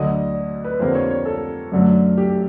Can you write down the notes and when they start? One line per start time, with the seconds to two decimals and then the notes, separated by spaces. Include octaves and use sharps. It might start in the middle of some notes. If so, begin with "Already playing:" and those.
Already playing: D2 D3 F#3 D#5
0.34 D5
0.64 B4
0.79 F2 D3 G3 A#3 C5
0.95 C#5
1.10 C#5
1.25 A4
1.72 F#2 D3 F#3 A3
2.18 G4